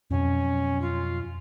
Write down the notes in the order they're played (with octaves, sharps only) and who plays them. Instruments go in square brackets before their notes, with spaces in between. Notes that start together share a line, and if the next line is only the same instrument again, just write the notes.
[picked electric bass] F2 B2 F#3 [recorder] C#4
[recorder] F4